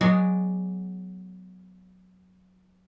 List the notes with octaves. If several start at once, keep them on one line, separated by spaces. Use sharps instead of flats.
F#3 G#3 B3 F#4 G#4 D5